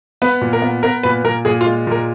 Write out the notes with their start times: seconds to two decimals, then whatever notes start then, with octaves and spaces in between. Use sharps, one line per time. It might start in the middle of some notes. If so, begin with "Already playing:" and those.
0.22 B3 B4
0.41 A#2
0.53 A#4
0.62 B3
0.83 B3 A#4
1.03 A#2 B4
1.24 A#2 A#4
1.45 A#2 G#4
1.61 F4
1.66 G#3
1.87 A#2 A#4